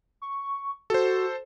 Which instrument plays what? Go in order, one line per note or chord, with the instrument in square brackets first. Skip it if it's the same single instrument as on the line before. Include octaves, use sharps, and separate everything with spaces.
[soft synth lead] C#6
[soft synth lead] F#4 [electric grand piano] A4 C5